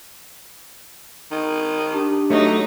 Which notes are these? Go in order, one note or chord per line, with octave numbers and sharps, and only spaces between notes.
D#3
D4 G4
F#3 A3 D#4